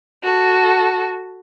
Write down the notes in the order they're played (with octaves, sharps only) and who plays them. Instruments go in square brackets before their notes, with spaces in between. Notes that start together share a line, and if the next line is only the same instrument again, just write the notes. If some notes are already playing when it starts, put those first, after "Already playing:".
[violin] F#4 A4